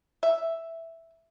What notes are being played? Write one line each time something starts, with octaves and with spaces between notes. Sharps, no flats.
E5